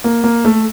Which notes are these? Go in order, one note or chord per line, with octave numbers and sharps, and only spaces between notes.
A#3
A#3
A3